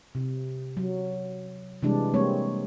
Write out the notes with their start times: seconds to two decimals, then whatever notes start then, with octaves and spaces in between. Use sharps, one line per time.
0.15 C3
0.77 F#3
1.82 C3 E3 G3 G#3 D4
2.14 G3 G#3 A#3 C4 C#5